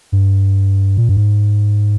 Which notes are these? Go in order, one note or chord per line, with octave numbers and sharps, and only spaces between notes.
G2
A#2
G2
G#2